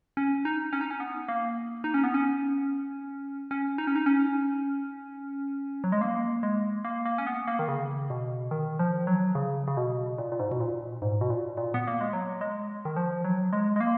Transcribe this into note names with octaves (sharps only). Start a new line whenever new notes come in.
C#4
D#4
C#4
D#4
C#4
B3
A#3
D#4
C#4
B3
C#4
C#4
D#4
C#4
D#4
C#4
F#3
G#3
A#3
G#3
A#3
A#3
C#4
B3
A#3
D#3
C#3
B2
D#3
F3
F#3
C#3
C#3
B2
A#2
A#2
G#2
B2
A#2
G#2
B2
A#2
A#2
B3
A#3
G#3
F#3
G#3
D#3
F3
F#3
G#3
G#3
A#3